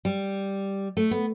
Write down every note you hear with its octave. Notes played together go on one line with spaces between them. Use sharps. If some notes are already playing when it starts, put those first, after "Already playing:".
G3
A3
B3